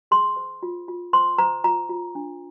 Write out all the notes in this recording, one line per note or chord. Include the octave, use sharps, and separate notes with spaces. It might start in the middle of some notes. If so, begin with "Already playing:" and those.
G#4 C6
C5
F4
F4
C5 C6
C5 A#5
F4 A#5
F4
D4